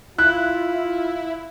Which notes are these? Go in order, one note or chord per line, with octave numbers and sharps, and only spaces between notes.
E4 F4 F#6